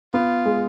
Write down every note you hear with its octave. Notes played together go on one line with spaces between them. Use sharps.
B3 F4
G#3